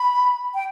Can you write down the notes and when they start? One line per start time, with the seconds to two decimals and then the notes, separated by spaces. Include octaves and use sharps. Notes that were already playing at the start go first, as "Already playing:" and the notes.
Already playing: B5
0.54 G5